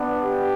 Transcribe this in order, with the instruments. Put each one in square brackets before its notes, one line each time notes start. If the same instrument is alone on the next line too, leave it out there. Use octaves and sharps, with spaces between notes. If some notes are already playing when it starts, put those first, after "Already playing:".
Already playing: [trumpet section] B3 D4
G4